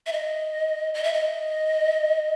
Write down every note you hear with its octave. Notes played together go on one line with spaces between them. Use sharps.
E5
D#5
D#5
E5
D#5